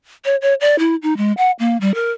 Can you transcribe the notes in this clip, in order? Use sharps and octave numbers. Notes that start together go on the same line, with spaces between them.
C#5
C#5
D5
E4
D#4
G#3
F#5
A#3
G3
A#4